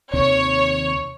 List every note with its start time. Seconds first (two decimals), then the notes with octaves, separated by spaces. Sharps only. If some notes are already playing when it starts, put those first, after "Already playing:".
0.13 D#2 C3 D#3 C#5